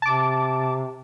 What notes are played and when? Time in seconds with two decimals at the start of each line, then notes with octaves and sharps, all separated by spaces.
0.02 C3 A5 D6